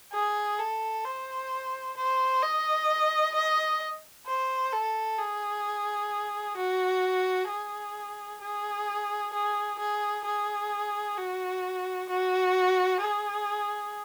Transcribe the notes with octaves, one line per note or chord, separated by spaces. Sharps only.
G#4
A4
C5
C5
D#5
D#5
C5
A4
G#4
F#4
G#4
G#4
G#4
G#4
G#4
F#4
F#4
G#4